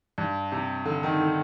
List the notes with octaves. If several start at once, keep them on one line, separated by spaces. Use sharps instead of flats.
G2
C3
D3
D#3
D3